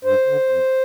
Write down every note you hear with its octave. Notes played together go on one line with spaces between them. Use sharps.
G2 C5
D3
F2